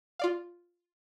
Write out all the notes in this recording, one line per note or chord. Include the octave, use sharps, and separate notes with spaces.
F4 D5 F5